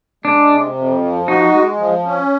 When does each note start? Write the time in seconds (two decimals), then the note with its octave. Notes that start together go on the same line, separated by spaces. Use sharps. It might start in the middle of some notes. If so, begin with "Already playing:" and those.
0.25 G#3 D4
0.51 C3
0.76 F2
1.01 F3
1.28 D#4 F#4
1.54 G#3
1.79 F3
2.06 C#4